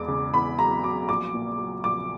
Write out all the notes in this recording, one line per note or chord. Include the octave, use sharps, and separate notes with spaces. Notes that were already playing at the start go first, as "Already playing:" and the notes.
Already playing: E1 E2 D6
C#3
E2 B5
F#3 A#5
F#3 D6
A#1 D6
A#2
F#3
A#1 D6